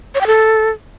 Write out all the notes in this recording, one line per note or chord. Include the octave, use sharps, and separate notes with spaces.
C#5
G5
A4